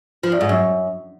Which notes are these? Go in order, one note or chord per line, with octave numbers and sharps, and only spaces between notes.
F3
E2
G#2
F#2